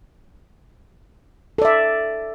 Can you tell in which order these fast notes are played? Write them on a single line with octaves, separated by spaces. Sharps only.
A4 D5 E5